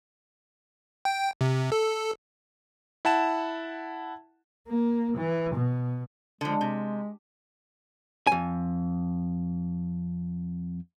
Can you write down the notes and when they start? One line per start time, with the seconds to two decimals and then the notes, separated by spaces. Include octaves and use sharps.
1.05 G5
1.41 C3
1.72 A4
3.05 E4 F#5 A5 E7
4.68 A#3
5.17 E3
5.55 B2
6.41 D3 F3 G#3
6.61 C3
8.27 F2 G#5